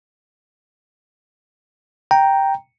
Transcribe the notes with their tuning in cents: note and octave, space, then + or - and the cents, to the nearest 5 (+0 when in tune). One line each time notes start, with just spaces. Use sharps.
G5 +0 A#5 +0